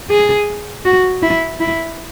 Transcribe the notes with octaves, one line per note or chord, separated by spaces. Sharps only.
G#4
F#4
E4
E4